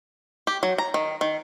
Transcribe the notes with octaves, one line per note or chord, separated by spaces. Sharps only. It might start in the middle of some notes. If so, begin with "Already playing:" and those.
G4
F#3
A#5
D#3
D#3